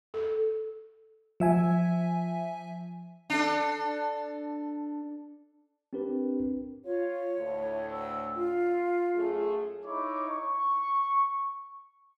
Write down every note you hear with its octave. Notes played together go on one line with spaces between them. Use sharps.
A4
F3 E5 G#5
D4 A4
C4 D4 G4 A#4 B4
F4 C#5
D2 A2
E6
F4
F#2 A3 G#4
D#4 E4 C#5 D6
C#6